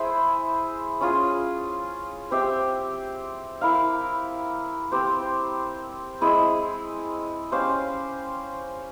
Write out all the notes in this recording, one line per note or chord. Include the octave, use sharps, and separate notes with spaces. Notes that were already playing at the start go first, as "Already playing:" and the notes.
Already playing: E4 G#4 C5 E5
C#4 F4 G#4
C4 G4 C5 E5
E4 A#4 F5
C4 G4 C5
G#3 C4 E4 G#4
C#4 G4 C5 F5